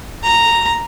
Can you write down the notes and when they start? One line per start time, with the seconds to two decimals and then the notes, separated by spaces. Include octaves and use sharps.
0.24 A#5